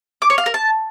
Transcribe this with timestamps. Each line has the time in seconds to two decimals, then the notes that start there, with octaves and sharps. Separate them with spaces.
0.22 D6
0.30 C#5
0.38 F5
0.46 A#4
0.54 A5